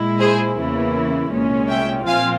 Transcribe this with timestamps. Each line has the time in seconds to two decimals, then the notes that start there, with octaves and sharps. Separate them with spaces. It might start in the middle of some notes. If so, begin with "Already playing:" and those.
Already playing: A#2 G#3 E4
0.20 G#4 C5
0.57 E2 C#3 E3 A#3 E4
1.32 C2 A#2 G#3 C#4
1.69 E5 G5
2.07 A#2 F3 C4 F4 F5 G#5